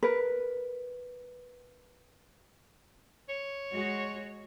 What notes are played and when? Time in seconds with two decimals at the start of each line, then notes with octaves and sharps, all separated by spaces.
0.03 A#4 B4
3.29 C#5
3.73 G#3 F#4